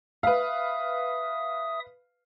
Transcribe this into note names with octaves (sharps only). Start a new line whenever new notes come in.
B4 E5 F5 D#6